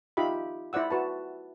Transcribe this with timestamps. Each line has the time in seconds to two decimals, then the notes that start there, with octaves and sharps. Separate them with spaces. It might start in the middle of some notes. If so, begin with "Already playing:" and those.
0.17 D#4 F4 G4 E5 B5
0.73 E4 C5 D5 F#5 E6
0.91 F#4 B4 A5